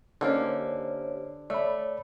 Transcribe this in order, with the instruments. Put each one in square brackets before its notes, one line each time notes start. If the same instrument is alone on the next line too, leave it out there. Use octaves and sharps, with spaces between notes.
[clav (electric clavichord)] D3 [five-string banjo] A#3 C#4 D#4 [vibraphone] G4 C5 C#5
[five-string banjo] A3 [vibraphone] C#5 [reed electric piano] D5 B5